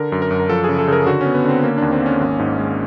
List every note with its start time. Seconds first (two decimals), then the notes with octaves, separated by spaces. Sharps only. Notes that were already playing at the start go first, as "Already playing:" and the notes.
Already playing: D3 A#4
0.12 F#2
0.22 A#4
0.31 F#2
0.40 A#4
0.49 F3 A4
0.64 C#3 G#4
0.78 A4
0.88 C#3 A#4
1.07 D3 F#4
1.21 B3 C#4
1.35 B3
1.45 D3 C4
1.63 A#3 C#4
1.78 D#2 D4
1.92 C4
2.02 A#3 C#4
2.20 G#1
2.39 G#2
2.58 G#3